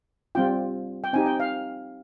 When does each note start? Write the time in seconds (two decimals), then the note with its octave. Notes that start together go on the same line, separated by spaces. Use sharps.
0.35 G3 C4 F4 G5
1.04 G5
1.13 C4 D#4 G4 G#5
1.26 G5
1.40 F5